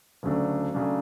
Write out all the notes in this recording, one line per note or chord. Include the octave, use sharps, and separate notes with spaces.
D2 C#3 F#3 A3 D4
C#3 F#3 A3 D4